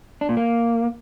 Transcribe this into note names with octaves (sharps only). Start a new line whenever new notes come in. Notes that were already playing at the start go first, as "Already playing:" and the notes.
D4
A#2
A#3